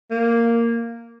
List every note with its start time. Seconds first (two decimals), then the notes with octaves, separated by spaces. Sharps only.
0.11 A#3